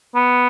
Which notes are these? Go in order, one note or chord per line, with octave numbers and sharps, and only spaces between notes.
B3